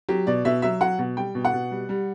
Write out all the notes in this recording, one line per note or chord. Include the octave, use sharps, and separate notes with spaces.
F#3 G4
B2 D5
B2 E5
F#3 E5
F#3 F#5
B2
G3 G5
B2
F#5
B2
G3
G3